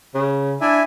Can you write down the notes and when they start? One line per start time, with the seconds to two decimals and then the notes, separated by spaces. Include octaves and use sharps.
0.14 C#3
0.61 D4 E4 E5 G#5